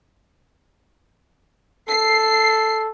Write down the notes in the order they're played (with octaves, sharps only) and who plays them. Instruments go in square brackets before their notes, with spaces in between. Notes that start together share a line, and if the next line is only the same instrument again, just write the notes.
[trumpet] A4 [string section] C7